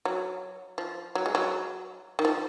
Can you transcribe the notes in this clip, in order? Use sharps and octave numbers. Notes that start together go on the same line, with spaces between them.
F#3
F3
F#3
G#3
F#3
D#3
F3